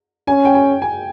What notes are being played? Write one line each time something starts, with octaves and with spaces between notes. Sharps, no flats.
C#4 G#5
G5
G#5
G#5